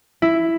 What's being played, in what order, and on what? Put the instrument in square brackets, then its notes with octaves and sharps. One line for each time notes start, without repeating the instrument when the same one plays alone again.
[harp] E4